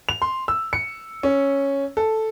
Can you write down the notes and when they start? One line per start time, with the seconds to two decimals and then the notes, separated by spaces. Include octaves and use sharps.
0.09 F7
0.22 C6
0.48 E6
0.73 C#7
1.23 C#4
1.97 A4